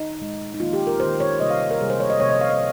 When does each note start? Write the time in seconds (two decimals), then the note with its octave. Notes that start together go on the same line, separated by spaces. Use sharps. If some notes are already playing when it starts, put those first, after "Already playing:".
Already playing: D#4
0.20 A#2 G#3
0.54 D#4
0.60 D#3 A#3 F4
0.73 G4
0.87 A#4
1.00 A#3 C5
1.05 D#3
1.20 C#5
1.40 C3 G3 A#3 D#5
1.50 F5
1.71 A#4
1.81 C3 G3 A#3 G#4
1.90 C5
2.00 C#5
2.10 D#5
2.20 C3 F3 A#3 C#5
2.30 D#5
2.41 F5
2.50 D#5